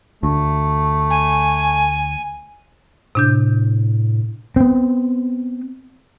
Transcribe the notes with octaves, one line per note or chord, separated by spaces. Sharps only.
D2 A3
G#5
A2 C3 D4 G6
B3 C4